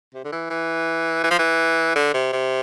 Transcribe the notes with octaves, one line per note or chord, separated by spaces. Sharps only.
C3
D3
E3
E3
E3
F3
E3
D3
C3
C3